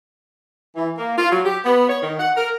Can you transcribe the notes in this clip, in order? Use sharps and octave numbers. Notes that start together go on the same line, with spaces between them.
E3
A#3
F4
F#3
G4
B3
C#5
D#3
F#5
A#4